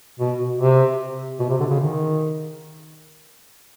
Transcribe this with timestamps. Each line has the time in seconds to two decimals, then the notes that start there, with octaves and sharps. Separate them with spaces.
0.19 B2
0.59 C3
1.40 B2
1.50 C3
1.60 D3
1.70 C#3
1.80 D#3